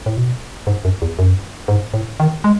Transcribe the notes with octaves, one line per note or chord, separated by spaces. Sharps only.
A2
B2
G#2
F#2
E2
F#2
G#2
A2
D#3
G#3